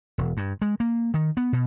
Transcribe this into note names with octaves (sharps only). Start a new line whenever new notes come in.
E1
G2
G#3
A#3
D#3
B3
B2